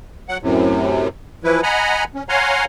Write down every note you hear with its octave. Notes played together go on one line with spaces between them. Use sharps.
F#3 F#5
F#2 A2 C3
E3 F3 E4 B4
D#5 F#5 G#5 A#5 B5
C#4
C#5 F5 F#5 G#5 A#5 C6